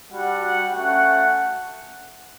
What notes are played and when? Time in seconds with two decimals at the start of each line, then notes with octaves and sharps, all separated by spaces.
0.11 G3 D4 F#4 F#5
0.41 F#5
0.71 A3 C#4 F#4 F#5